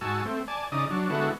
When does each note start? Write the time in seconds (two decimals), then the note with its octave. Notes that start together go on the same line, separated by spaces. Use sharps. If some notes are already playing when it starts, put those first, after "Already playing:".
0.01 G#2 F#4 G#5 A5 E6
0.25 A3 C4
0.48 D5 G#5 A5
0.72 C#3 D#4 D5 D#6
0.91 F#3 D4
1.10 D3 G#3 B3 E4 F#4 A4